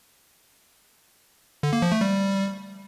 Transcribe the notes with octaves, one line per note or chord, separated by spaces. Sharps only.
D3
A#3
F3
A3
G3